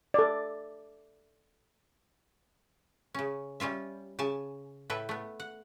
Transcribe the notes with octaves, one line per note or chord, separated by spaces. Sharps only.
A4 D5
C#3 C#4
G3 C#4 F4 E5
C#3 G#5 A5
A2 A4 B4 E5 G5
A3 B3
F#5